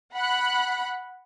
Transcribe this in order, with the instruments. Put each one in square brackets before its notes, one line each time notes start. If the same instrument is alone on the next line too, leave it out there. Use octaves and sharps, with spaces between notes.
[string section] F#5 B5 F#6